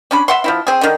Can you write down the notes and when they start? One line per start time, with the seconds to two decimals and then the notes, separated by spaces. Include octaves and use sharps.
0.11 C#4 D4 B5
0.28 E5 F#5 C6
0.44 F3 C4 E4
0.67 C4 G#4
0.81 D3 D#3